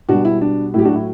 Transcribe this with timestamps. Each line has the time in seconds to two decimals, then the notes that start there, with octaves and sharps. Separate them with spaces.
0.09 B2 G3 D4 F#4
0.25 E4
0.41 D4
0.74 A2 E4
0.77 F#3 G4
0.85 D4 F#4
0.95 E4